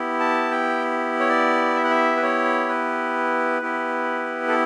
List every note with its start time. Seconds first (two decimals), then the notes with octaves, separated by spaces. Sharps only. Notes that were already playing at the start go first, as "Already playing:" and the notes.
Already playing: B3 E4 G4
0.20 A5
0.51 G5
1.20 C#5
1.29 D5
1.75 E5
1.84 F#5
1.90 E5
2.16 B4
2.22 C#5
2.68 B4
3.62 B3 E4 G4
4.48 A4